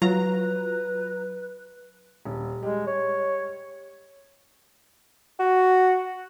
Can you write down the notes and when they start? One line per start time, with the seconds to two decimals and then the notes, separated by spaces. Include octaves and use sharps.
0.02 F#3 F4 B4 A#5
2.25 D#1
2.63 G3 G#3
2.87 C#5
5.39 F#4